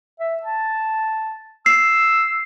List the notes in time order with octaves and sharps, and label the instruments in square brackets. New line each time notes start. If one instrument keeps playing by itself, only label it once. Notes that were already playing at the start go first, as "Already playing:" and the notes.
[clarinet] E5
A5
[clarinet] E6 [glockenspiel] C7